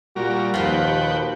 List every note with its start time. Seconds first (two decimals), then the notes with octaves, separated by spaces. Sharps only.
0.16 A#2 G3 F#4 A#4
0.54 D#2 A#2 F3 F4 F#4 B4 G5